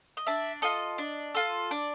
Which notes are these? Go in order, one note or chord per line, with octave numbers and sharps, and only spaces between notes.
D#5
D4 E5
F4 A4 D#5
D4
F4 A4
D4 D5